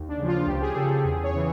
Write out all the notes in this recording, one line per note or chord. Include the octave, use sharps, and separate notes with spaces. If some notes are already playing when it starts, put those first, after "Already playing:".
Already playing: D#2
D4
C#3
F3 F4
C#2 G4
G#4
C#3 F3 A4
G#4
E2 G#4
C#5
C#3 E3